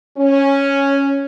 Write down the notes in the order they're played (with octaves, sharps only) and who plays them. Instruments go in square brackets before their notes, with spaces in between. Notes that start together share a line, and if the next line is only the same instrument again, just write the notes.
[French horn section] C#4